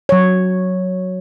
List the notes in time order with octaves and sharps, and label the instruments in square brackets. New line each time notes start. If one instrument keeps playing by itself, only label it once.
[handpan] F#3 C#5